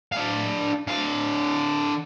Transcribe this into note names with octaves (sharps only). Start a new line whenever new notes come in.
D4 F5
D3 F5